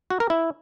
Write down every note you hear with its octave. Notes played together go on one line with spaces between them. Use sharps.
F#4
A#4
E4